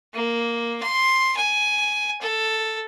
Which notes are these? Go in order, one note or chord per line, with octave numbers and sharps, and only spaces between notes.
A#3
C6
G#5
A4